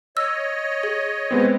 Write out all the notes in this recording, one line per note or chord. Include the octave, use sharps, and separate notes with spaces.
C#5 D#5 E6
G#4
G#3 B3 C4